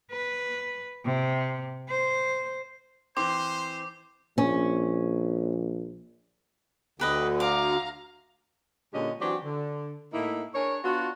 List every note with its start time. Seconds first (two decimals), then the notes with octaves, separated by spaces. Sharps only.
0.12 B4
1.05 C3
1.89 C5
3.17 E3 C4 C5 C6 D6
4.38 A#1 C#4
6.99 D2 D3 G4 B4 D#5
7.40 F5 A#5 D6
8.93 A#2 D3 G#3 C#4 G4 D#5
9.20 E3 F#3 C4 D4 F#4 G4
9.44 D3
10.13 A2 A#3 D#4 E4
10.54 D4 G#4 A#4 C#5
10.84 B3 D4 F4 F#4